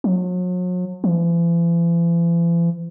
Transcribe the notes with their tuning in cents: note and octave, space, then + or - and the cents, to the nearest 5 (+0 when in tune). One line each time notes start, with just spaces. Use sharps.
F#3 -40
E3 +45